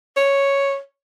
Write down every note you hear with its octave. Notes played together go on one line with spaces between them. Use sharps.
C#5